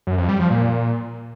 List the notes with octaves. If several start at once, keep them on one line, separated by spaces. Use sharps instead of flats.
F#2
F2
G3
F3
A#2